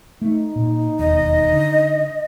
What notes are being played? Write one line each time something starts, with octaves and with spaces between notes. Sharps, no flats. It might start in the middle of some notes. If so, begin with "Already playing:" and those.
A3 D#4
A#2
E1 D#2 D#5
D3